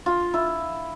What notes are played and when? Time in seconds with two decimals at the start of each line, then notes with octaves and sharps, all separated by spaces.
0.06 F4
0.34 E4